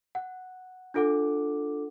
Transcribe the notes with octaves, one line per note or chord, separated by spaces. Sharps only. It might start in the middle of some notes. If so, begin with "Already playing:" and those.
F#5
D4 F4 A4 F#5 D6